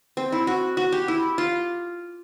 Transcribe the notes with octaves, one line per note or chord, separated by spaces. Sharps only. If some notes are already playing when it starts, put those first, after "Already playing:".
C4
E4
F#4
F#4
G4
E4
F4